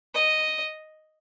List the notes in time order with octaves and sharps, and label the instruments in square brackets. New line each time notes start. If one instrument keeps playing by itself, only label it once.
[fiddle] D#5